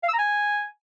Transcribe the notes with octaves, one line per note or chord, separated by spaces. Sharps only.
F5
E6
A#5
G#5